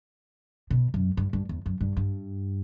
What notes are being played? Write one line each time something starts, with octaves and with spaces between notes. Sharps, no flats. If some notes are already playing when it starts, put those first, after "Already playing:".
B2
F#2
G2
G2
E2
F#2
G2
G2